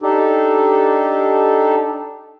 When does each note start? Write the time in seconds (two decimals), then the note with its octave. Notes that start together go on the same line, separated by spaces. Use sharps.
0.02 D4 D#4 G4 A4